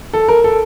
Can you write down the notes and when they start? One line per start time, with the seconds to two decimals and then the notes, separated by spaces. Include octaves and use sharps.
0.14 A4
0.28 A#4
0.44 A4